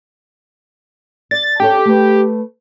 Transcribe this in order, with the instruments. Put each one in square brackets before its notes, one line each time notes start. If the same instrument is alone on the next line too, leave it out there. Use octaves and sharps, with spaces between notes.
[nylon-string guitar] D5 [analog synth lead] A6
[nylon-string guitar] D4 A4 C#5 [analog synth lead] G4
[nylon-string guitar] A3 B4